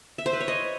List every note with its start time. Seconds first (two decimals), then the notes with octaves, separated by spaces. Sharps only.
0.18 E5
0.26 C5
0.33 B4
0.41 C#5
0.48 D#5